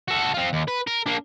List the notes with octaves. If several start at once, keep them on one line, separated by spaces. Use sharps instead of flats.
F#4 A4
C4 F4
D#2
B4
A#4
A#3 D4